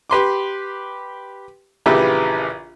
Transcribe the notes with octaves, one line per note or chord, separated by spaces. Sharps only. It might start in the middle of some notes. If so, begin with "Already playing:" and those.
G4 B4 C6 D6
A#1 C#3 E3 G4 B4 E5